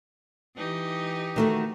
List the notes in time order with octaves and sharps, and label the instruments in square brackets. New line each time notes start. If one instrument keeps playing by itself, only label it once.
[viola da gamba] E3 D#4 G4
[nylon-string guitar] D#3 A3 F#4